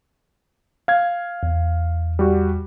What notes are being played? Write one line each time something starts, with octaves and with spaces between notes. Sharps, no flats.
F5 G#6
E2
G3 F#4